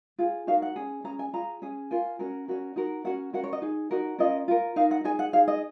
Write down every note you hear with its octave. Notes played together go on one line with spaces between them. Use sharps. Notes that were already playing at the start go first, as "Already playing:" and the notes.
F4 G#4
D#4 F#4 A#4 F5
F#5
C#4 G#4
C#4 G#4 A#5
G#5
F4 G#4 A#5
C#4 G#4
F4 A#4 G#5
C#4 F#4 A#4
C#4 F#4 A#4
D#4 F#4 A#4
C#4 F#4 A#4 F#5
C#4 F#4 A#4 F#5
C#5
D#5
D#4 G#4
D#4 F#4 A#4
C#4 F4 A#4 D#5
F4 A#4
D#4 A#4 F5
F#5
D#4 G#4 G#5
F#5
D#4 G#4 F5
D#5